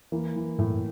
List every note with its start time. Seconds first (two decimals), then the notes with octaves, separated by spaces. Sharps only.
0.12 E3 A#3
0.36 E3
0.58 A2